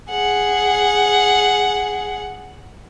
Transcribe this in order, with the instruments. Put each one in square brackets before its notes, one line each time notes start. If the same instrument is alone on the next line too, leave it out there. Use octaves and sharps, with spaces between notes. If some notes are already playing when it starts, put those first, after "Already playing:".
[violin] G#4 F#5